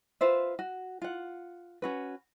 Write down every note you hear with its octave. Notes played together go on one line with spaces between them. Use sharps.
F4 B4 C5 E5
F#4
F4 F#5
C#4 F#4 B4